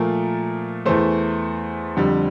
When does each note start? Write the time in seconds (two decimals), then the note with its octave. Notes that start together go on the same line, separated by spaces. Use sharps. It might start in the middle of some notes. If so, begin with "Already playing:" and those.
Already playing: A#2 F3 A3 A#4
0.85 E2 E3 A3 C5
1.97 F2 D3 G3